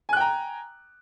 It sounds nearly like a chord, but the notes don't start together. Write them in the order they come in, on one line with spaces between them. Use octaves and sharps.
G#5 F#6 G5 A#5